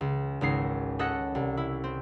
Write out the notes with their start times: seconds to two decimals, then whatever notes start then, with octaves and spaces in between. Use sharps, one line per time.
0.01 C#2
0.41 G#1 C#2 D#4 C7
0.99 C#4 A4 D#5 F#5 A#6 C#7
1.35 C2
1.57 E4
1.84 C4